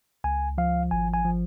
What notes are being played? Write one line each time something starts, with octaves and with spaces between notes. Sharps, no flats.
C#2 G#5
F3 F5
G#1 G#5
G#5
F3